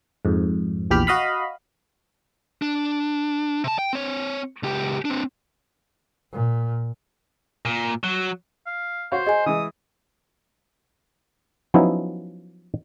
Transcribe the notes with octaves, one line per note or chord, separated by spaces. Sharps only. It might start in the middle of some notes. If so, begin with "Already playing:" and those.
F2 G#2
A#1 E2 G4 B5 F6
F#4 D#5 F5 B5
D4
C3 A5
G5
C4 C#5
C#2 G4
C4 D4
A#2
A#2
F#3
F5
F#4 C5 C#5 F5
G#4 D#5 G#5
E3 G#3 D#6
F3 F#3 B3 C#4 D#4 E4